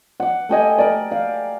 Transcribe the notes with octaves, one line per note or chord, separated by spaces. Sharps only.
F#5 D6
A3 G4 D#5 G#5
A#4 D5
F5